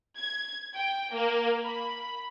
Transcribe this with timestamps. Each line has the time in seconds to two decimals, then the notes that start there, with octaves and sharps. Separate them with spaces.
0.18 G#6
0.74 G5
1.12 A#3
1.64 B5